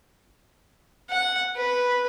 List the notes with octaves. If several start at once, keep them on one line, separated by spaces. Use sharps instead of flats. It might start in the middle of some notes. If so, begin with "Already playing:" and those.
F#5
B4